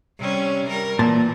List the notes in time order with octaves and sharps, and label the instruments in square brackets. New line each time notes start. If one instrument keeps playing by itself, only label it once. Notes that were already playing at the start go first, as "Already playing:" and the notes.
[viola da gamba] C3 G3 C#4
G3 A#4
[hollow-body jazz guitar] A#2 A5 [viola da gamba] E3